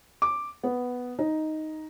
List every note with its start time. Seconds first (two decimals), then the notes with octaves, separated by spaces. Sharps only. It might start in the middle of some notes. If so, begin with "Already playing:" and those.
0.22 D6
0.64 B3
1.19 D#4